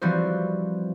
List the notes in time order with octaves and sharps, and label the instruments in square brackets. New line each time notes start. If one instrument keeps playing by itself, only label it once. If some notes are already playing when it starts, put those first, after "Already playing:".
[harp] E3 F3 G3 C4 F#4 C5